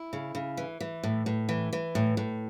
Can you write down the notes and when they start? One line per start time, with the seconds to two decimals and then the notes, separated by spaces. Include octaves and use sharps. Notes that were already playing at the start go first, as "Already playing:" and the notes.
Already playing: E4
0.13 C#3
0.35 C#3
0.57 E3
0.81 E3
1.03 A2
1.26 A2
1.49 E3
1.73 E3
1.95 A2
2.17 A2